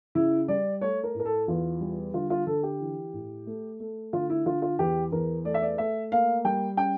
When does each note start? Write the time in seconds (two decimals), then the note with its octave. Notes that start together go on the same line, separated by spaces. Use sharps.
0.15 C#3 E4
0.48 G3 D5
0.81 A3 C#5
1.04 A#4
1.15 A2
1.20 A#4
1.25 A4
1.48 E2 F4
1.81 G3
2.14 D3 F4
2.30 F4
2.47 D3 A4
2.63 G4
2.80 E3
3.13 A2
3.46 A3
3.80 A3
4.13 D3 F4
4.30 E4
4.46 D3 F4
4.62 F4
4.79 E2 G4
5.12 E2 A#4
5.45 A3 D5
5.54 E5
5.62 D5
5.78 A3 E5
6.12 A#3 F5
6.44 G3 G5
6.77 C#4 G5